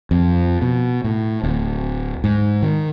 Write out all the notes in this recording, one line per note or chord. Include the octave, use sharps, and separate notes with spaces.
F2
B2
A2
D1
G#2
D#3